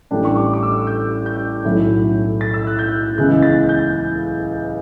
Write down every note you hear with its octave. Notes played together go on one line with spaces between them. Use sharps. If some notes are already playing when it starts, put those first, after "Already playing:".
A1 A2 G3 D4 G5
C#6
D6
D6
E6
G6
G6
B1 A2 F#3 C#4 E4
A6
E6
F#6
G6
C#2 C#3 E3 B3 F#6
A6
G6